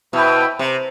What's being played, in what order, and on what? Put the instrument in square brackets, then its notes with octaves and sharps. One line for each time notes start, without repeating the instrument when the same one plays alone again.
[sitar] B2 [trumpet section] E4 B4 E5 G5
[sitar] C3